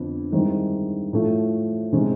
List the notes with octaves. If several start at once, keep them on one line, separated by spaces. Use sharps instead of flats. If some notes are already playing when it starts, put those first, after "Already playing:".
Already playing: F2 D3 B3
G2 D#3 G#3 C4 E4
A2 F3 A3
C3 D#3 G#3 C#4